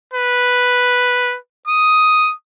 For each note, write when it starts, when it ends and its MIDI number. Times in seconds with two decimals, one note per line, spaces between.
0.14 1.37 71
1.68 2.33 87